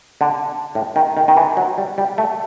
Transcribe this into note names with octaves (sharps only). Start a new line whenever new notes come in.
D3
A2
D#3
D#3
D#3
E3
F#3
G3
G3
A3